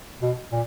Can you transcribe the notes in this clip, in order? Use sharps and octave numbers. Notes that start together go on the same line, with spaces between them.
B2
A#2